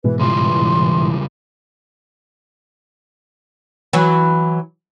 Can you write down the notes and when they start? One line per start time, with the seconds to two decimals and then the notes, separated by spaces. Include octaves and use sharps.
0.04 G#2 B2 E3 G#3 B4
0.20 C#3 G3 F4 C6
3.93 E3 F#3